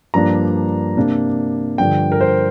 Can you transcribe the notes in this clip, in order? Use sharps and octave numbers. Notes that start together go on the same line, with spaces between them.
G2 F3 A#3 D4 A#5
C3 A#3 D4
G2 D3 F3 G5
A#4
C5